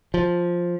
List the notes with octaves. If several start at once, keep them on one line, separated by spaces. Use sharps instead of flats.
F3